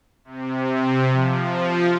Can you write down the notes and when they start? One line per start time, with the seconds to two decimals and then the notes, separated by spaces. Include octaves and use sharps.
0.25 C3
1.12 F3